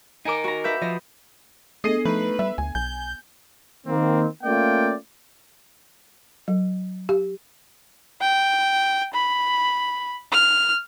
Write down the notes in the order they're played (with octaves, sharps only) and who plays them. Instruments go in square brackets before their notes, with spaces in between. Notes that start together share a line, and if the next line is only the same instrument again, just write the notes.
[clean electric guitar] D#4 A#4 [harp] G#5 D6
[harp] F#4 A#5
B4 E5 G6
[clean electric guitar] F3 [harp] D#5
[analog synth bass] A3 [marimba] B3 D4 A4 [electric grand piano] G#4 C7 D#7 [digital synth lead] D#5
[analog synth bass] F3 [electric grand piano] A3 D#4 [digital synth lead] B4
[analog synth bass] G3 [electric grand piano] E5
[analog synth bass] D2 [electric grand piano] G#5
[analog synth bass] B1 [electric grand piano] G#5 [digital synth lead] G6
[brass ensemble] D#3 A#3 C4
A3 A#3 C#4 F4 D5 G5
[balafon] F#3
G4
[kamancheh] G5
B5
F6